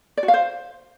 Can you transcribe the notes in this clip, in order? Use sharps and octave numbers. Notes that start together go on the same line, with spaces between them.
D5
F#4
F5
C5